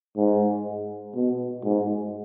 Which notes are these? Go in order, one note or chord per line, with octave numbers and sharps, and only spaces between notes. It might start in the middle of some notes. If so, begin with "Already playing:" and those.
G#2
B2
G#2